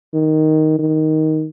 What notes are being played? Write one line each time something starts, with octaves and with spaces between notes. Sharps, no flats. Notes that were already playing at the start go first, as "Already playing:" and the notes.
D#3
D#3